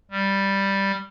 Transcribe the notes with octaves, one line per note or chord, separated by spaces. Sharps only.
G3